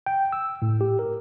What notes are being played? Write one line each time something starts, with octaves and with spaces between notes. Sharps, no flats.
G5
E6
A2
G4
A#4